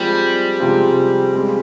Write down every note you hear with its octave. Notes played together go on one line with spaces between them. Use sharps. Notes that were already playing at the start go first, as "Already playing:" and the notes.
Already playing: F3 G3 G#3 C4
C3 F3 G#3 C4 F4
G#3 C4 G4